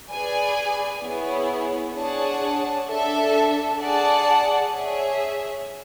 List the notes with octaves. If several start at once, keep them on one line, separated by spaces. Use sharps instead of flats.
G#4 B4 D5 G#5
B3 E4 G#4 C#5
D4 G#4 C#5 F#5 A5
D4 A4 E5
G#4 D5 F#5 A5
G#4 C#5 E5